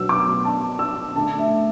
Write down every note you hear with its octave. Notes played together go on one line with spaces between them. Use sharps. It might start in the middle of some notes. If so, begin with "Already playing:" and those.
Already playing: B2 F#3 B3 E6
D6
A5
E6
D3 A3 A5
E5